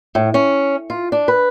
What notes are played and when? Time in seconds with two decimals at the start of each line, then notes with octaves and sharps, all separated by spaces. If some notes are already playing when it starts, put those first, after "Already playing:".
0.15 A2
0.34 C#4
0.90 F4
1.12 D4
1.28 B4